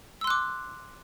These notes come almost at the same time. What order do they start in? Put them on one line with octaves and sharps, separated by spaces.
E6 C6 F#6 D6